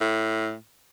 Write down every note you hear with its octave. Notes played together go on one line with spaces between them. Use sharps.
A2